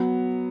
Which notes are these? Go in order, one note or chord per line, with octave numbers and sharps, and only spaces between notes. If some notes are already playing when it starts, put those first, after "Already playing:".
Already playing: F#3 B3